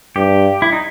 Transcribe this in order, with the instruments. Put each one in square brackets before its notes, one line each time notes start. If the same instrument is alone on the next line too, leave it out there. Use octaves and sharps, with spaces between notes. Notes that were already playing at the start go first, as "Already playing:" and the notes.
[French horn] G2 [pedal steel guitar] G4
[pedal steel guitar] E4
D#4